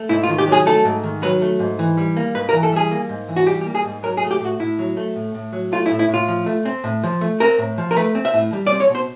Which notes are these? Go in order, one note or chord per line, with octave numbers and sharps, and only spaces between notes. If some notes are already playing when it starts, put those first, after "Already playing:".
Already playing: A3
G#2 E4
F4
D#3
G4
F#3 G#4
A3 A4
G#2
D#3
F#3 B4
A3
G#2
E3
G3
A#3
G#2 B4
A#4
E3
A4
G3 G#4
A#3
G#2
E3
F#4
G3 G4
G4
A#3
G#4
G#2
F#3 A#4
G#4
A3
G4
A2 F#4
A2 E4
F#3
A3
A2
A2
F#3
A3 F4
E4
A2
E4
A2 F4
F3
A3
C4
A2
F3
A3
C4 A#4
A2
F3
A#4
A3 B4
C4
E5
A2
G3
D5
C4
C#5
B2 C5